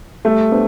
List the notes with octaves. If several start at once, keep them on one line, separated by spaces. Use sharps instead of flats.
G3 A3
B3 D4 G4 C5